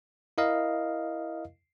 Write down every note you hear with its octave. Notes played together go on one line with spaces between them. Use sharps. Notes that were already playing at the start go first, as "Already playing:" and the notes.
E4 A#4 D#5 F5